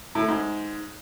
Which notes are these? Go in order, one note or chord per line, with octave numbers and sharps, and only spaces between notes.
A2
A3
G#2